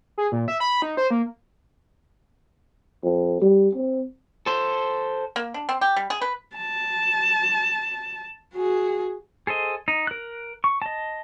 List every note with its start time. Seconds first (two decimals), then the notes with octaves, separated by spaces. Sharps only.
0.18 G#4
0.32 A#2
0.48 E5
0.60 B5
0.82 D#4
0.97 C5
1.11 A#3
3.03 F2
3.41 G3
3.74 C4
4.46 A4 C5
5.36 A#3
5.54 D4
5.69 C4
5.81 G4
5.96 G3
6.10 G#4
6.21 B4
6.56 A5
8.55 F#4 G#4
9.47 G#4 A4 C5 D#5
9.88 D#4
10.07 A#4 F#6
10.64 C#6
10.82 D#5 A5